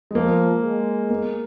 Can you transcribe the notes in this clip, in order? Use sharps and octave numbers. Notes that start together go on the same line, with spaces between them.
G#3
F3 A#3
G#3
A#3